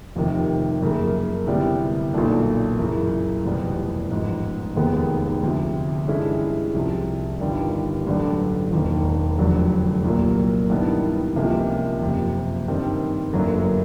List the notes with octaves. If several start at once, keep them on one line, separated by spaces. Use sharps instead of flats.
F1 F2 C3 D#3
F#2 C#3 F3 A#3
D2 C3 E3 G3 B3
B1 A#2 F#3 A3 D4
F#2 C#3 E3
F1 E2 B2 G3 B3
A1 G#2 F3
F1 D#2 D#3 G#3 B3
D2 C3 F3
G2 E3 G#3 C#4 E4
C2 C3 F3
G1 G2 D#3 G3
A1 G2 D3 F#3
E1 D#2 D#3
F1 F2 D3 F#3 A3
C2 A#2 F#3 A#3
G2 D#3 G3 B3 E4
C#2 C3 F3 A#3 C#4
F#1 F2 C3
G2 D#3 G3 C4
G1 F#2 D3 F#3 A#3